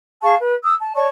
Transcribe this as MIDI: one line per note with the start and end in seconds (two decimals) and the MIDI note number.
0.22 0.34 68
0.22 0.34 77
0.22 0.34 81
0.22 0.34 85
0.38 0.54 71
0.63 0.73 87
0.63 0.73 88
0.80 0.93 81
0.94 1.06 73
0.94 1.06 74
0.94 1.06 81
0.94 1.06 85